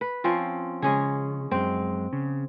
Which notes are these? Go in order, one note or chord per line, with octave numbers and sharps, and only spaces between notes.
B4
F3 C4 C#4
C#3 G#3 C#4 G#4
F#2 G#3 C4
C#3